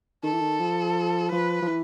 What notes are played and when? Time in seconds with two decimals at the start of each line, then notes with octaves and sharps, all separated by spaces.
0.23 D#3 A4
0.32 E3
0.40 D#3
0.60 F3
1.32 F3 B4
1.62 F3
1.67 E3